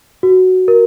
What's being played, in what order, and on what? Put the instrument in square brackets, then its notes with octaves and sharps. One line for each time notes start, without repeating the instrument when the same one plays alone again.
[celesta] F#4
A#4